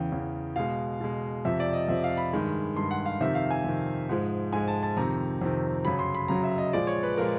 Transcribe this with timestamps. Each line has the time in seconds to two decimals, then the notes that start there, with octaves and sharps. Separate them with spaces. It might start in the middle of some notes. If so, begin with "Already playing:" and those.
Already playing: E2 C#3 E3 G5
0.12 E2 C#3 E3
0.56 B2 G#3 F5
1.01 B2 G#3
1.45 F2 C3 F3 E5
1.60 D5
1.73 D#5
1.88 F2 C3 F3 E5
2.04 F5
2.17 B5
2.33 G2 D#3 G#3
2.76 G2 D#3 G#3 C6
2.91 F#5
3.06 F5
3.20 F2 C3 D#3 E5
3.35 F5
3.51 G#5
3.64 F2 C3 D#3
4.09 G#2 F3 G#3
4.52 G#2 F3 G#3 G#5
4.68 A5
4.83 A5
4.97 F2 C3 D#3 A#5
5.41 F2 C3 D#3
5.85 F#2 C#3 F#3 B5
5.99 C6
6.15 B5
6.28 F#2 C#3 F#3 A#5
6.44 E5
6.58 D#5
6.73 A#2 F3 G#3 D5
6.87 C#5
7.03 B4
7.17 A#2 F3 G#3 A#4